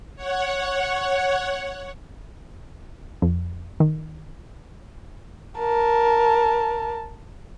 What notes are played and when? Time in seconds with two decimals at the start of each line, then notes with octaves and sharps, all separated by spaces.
0.16 C#5 F#5
3.22 F2
3.80 D#3
5.60 A#4 A5